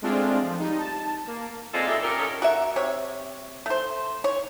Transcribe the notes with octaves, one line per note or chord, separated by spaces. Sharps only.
G#3 A3 C4 D4 F4
F3
G3 D#4
A5
A#3
G#3 C4 D4 D#4 F4 A4
A#2 E3 D#4 G4 A4 E5
A#2 C#4 G4 A4 A#4
F#3 C#4 D#4 G4 A4 A#4
F#4 A#4 E5
C3 C#5
A3 C5
C#5